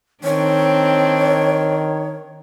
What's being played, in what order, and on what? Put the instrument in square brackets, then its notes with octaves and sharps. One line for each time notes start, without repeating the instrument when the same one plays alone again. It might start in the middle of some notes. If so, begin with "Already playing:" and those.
[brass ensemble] D#3 [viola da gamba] C4 D4 [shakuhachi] C#5